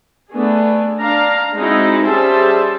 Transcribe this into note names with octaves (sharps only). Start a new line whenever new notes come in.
A3 B3 D4 G#4
D4 F5 A#5
G#3 C4 D#4 E4 F#4
G3 C#4 G#4 C5 E5 A5